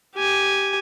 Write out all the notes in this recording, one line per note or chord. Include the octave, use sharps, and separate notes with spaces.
G4 G#5